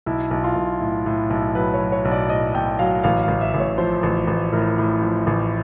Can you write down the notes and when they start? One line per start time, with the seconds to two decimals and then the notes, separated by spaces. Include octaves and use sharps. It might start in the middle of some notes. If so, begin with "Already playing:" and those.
0.06 B1 E4
0.31 B1
0.44 F4
0.56 B1
0.81 A2
1.06 A2
1.30 B1
1.55 F#3 B4
1.74 C#5
1.80 F#3
1.92 C#5
2.05 B1
2.11 D5
2.29 A2 D#5
2.54 B1 G5
2.79 F#3 F5
3.04 A1 F5
3.23 F5
3.28 A1
3.41 E5
3.54 A1
3.60 C#5
3.78 F3 C5
4.03 A1
4.28 A1
4.52 A2 A#4
4.78 A2
5.02 F3
5.27 A1